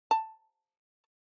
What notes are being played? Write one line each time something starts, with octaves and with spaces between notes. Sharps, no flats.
A5